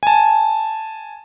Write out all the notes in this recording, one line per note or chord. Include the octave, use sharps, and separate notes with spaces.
G#5 A5